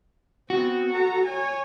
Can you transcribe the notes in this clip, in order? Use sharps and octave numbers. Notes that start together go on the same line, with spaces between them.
B3 C4 F#4
A4 A#5
C#5 G#5